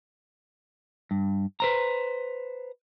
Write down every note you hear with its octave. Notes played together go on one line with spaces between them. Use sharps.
G2
B4 C5 A#5